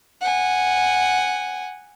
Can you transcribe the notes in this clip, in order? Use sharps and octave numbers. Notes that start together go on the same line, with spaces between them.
F#5 G#5